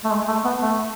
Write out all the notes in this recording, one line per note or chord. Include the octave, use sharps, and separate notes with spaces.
A3
G#3
A3
B3
A3